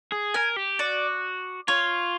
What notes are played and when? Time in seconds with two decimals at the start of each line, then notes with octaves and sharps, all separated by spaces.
0.12 G#4
0.34 A#4 G#5
0.56 G4
0.79 F#4 D5
1.68 F4 C#5